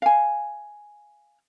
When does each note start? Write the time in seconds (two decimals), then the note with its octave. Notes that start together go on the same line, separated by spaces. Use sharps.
0.02 F5 G#5